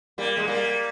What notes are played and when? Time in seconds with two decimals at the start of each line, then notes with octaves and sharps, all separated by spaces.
0.18 G3 A#3
0.37 G#3
0.47 G3 A#3